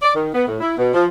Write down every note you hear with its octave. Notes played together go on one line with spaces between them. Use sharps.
D5
D#3
B3
A2
E4
B2
F3